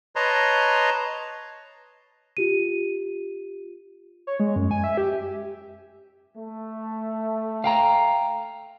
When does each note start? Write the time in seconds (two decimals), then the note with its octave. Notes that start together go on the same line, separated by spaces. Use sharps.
0.16 B4 C#5 D#5 A5 A#5 C6
2.37 F4 G4 D#7
4.27 C#5
4.40 G#3
4.56 F#2
4.71 G#5
4.84 E5
4.97 G4
6.37 A3
7.64 F5 G5 A#5